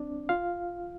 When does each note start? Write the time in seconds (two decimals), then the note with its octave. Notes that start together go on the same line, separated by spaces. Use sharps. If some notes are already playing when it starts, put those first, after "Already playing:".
Already playing: C4 D4 D5
0.29 F4 F5